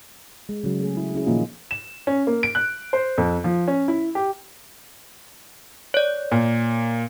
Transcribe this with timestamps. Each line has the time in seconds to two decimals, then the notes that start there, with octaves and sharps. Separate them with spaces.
0.49 G#3
0.64 C#3 F#3
0.79 A3 G#4
0.97 E4
1.14 C#4 E4 G#4
1.27 A#2 D#3 F3 A#3 D#4 F4
1.71 E7
2.07 C#4
2.27 A#3
2.43 D7
2.55 F#6
2.93 C5
3.18 F2
3.44 F3
3.68 C#4
3.88 E4
4.15 G4
5.94 C#5 D5
6.32 A#2